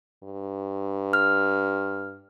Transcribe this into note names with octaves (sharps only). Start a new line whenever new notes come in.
G2
F6